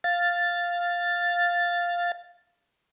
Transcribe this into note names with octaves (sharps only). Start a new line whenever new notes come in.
F5 A6